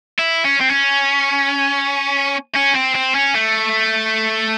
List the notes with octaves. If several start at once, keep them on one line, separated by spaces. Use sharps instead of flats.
E4
C#4
C4
C#4
C#4
C4
C4
C#4
A3